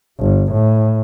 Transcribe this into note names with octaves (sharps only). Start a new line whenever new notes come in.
G1
A2